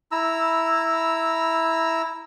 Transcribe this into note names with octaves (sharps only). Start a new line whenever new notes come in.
E4 A#5 E6